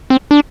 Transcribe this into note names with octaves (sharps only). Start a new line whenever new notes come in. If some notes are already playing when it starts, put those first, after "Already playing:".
C4
D4